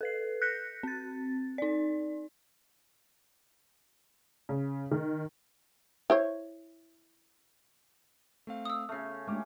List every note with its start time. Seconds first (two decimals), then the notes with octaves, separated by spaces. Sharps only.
0.01 A4 B4 C7
0.42 F#6 G6 A#6 B6 C#7
0.83 C4 A6
1.58 D#4 D5
4.49 C#3
4.91 D#3
6.10 E4 C5 C#5
8.47 A3 C4 F5
8.65 D#6 E6
8.89 C#3 A3 F6 C7
9.27 G#3 A3 C#4 D4 G4